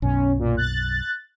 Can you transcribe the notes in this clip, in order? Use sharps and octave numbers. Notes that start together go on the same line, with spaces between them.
B1 F#2 B2 C#4
A#2
F#6 A6